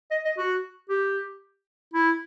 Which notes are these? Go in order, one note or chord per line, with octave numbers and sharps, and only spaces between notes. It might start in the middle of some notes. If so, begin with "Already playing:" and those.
D#5
D#5
F#4
G4
E4